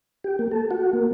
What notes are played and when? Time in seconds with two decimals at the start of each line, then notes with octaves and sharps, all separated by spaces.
0.24 G4
0.39 A#3
0.51 A4
0.71 F#4
0.93 A#3